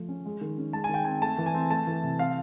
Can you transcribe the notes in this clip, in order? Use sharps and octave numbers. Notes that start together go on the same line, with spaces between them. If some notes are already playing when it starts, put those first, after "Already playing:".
Already playing: F3 A3
C#4
G#3
D#3
C#4
G#3 A5
G#5
D#3 G5
C4 G#5
A3 A5
E3
G#5
C4
A3 A5
E3
C3
C4 F5